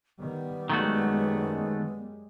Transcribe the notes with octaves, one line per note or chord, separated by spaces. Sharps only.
D#3 G3 B3
F#2 D#3 G#3 A3 F#4